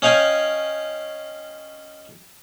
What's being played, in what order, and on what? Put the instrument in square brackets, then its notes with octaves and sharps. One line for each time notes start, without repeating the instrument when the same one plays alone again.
[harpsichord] C#4 D#5 F5 G5 G#5